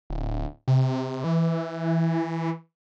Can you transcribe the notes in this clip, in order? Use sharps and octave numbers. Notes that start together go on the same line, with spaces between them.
D1
C3
E3